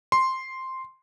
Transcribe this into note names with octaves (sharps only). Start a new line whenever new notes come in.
C6